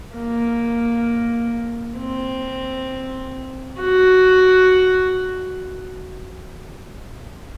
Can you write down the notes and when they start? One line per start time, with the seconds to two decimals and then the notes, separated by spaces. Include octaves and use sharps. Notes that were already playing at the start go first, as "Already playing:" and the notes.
0.16 A#3
1.99 C4
3.80 F#4